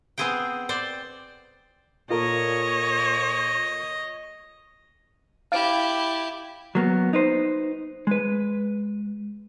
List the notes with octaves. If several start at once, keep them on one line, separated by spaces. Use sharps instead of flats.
B3 C4 G#4 C5 G5
C5 D5 G5
A#2 F4 A4 A#4 C#5 D#5
E4 G4 F5 A6 D7
F#3 A#3 B3
D#4 B4 C5
G#3 B4